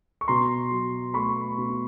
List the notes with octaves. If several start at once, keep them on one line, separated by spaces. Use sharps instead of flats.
C#6
B2 A#5 C6
F#3
A3 B5 C#6
B2